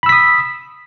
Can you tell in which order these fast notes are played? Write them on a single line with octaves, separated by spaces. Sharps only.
B5 E6 B6 D#6